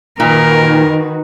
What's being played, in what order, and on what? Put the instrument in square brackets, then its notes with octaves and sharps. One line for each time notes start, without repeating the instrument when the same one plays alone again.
[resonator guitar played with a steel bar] A#2 [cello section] D#3 F#4 [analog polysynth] D#4 B4 [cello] A#4